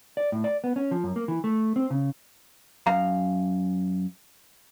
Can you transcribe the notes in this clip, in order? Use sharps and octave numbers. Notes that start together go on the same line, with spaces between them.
D5
A2
D5
B3
C#4
F3
F#2
A#3
E3
A3
C4
C#3
F#2 F5 A#5